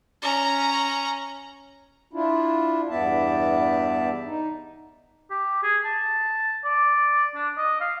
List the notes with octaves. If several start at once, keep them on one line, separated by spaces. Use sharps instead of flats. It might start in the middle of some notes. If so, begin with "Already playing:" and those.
C#4 A#5
D4 E4 F4
E2 G2 B3 D5 E5 A5
D#4
G4
G#4
A5
D5
D4
D#5
F5